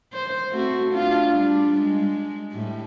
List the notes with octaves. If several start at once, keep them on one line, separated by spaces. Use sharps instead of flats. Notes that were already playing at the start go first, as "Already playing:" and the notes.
C5
A3 C4 F#4
D4 F4
G3 D4
G#3
A2 G3